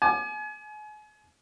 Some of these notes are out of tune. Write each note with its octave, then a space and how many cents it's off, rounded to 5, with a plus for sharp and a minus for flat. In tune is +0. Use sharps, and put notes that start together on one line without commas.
G#5 +35 D6 +30